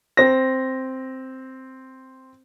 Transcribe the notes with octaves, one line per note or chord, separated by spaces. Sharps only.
C4 A#6